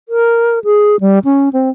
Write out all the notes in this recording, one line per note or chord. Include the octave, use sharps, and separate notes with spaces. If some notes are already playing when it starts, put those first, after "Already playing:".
A#4
G#4
G3
C#4
C4